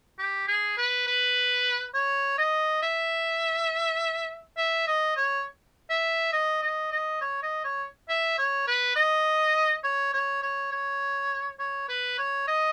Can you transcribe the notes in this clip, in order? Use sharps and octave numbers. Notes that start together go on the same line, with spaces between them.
G4
G#4
B4
B4
C#5
D#5
E5
E5
D#5
C#5
E5
D#5
D#5
D#5
C#5
D#5
C#5
E5
C#5
B4
D#5
C#5
C#5
C#5
C#5
C#5
B4
C#5
D#5